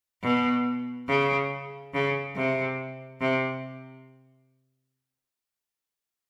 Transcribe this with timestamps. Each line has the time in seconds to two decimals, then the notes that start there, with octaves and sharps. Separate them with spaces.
0.23 B2
1.08 C#3
1.94 C#3
2.36 C3
3.21 C3